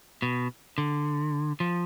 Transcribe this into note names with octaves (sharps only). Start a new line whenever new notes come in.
B2
D3
F3